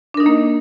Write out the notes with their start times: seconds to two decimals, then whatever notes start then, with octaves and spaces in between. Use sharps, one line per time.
0.14 D4
0.17 A#4
0.20 D#4
0.23 D#5
0.26 A#3